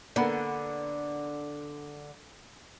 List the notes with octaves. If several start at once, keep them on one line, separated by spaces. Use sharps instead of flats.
D3 A#3 B3 F#5